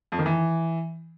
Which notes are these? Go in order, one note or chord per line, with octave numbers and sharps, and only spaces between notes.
F2
D#3
E3